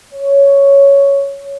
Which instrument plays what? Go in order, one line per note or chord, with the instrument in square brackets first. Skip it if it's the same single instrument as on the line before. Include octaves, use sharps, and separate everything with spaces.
[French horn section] C#5